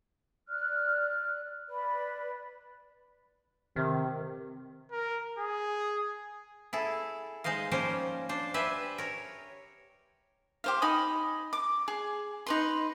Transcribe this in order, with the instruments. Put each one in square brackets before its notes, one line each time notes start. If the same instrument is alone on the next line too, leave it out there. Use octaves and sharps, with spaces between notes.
[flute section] D5 F6 F#6
B4 D5 B5
[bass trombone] C3 [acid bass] D#3
[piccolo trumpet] A#4
G#4
[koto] E4 G#4 A4
G#3 D#4 C5 D#5 F5
F3 G3 A#3 C#4 A#4 C5
D4 C5
G4 B4 C5 E5 G#5
A#4 C#5
[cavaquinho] G4 C5 F5
D#4 G#5 B5 D#6
D6
G#4
D#4 B4 C6